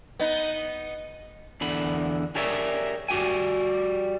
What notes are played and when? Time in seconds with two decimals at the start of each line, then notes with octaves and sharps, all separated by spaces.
0.20 B3 D#4
1.61 E2 D3 B5
2.35 G4 G#4 A#4 C#5 D5 E5
3.09 G3 F#4 G4 G5 G#5